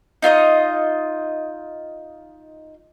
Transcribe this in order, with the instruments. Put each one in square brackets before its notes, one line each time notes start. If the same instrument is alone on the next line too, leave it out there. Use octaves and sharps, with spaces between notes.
[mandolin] D#4 F4 C#5 D#5